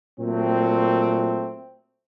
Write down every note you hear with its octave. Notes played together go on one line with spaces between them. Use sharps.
A#2 F#3 A3 C4